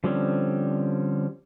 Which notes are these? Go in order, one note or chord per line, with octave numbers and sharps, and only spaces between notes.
D3 F3 G3 C4 C#4